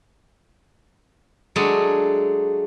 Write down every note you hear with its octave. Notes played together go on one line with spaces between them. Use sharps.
F#3 G#3 A3 D4 G#4 C#5